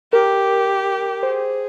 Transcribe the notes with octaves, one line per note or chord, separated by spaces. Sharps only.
G4 A#4
G#4 C5